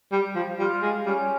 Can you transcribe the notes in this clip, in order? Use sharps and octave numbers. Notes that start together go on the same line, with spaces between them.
G3
F3
G3 F4
G#3
G3 C#4